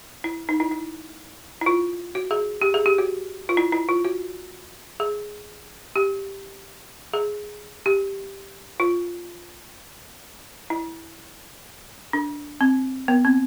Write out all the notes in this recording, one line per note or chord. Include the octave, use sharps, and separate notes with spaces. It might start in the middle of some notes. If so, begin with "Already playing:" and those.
E4
D#4
E4
E4
E4
F4
F#4
G#4
G4
G#4
G4
F#4
F4
E4
E4
F4
F#4
G#4
G4
G#4
G4
F4
E4
D4
C4
B3
C4